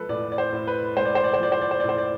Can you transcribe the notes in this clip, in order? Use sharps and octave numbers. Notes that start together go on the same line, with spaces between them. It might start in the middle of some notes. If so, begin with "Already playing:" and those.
Already playing: F3 G#3 A4 B4
A2 D5
D5
C5
A2
B4
G#3 C5
D5
C5
D5
C5
F3 D5
C5
D5
C5
A2 D5
C5
D5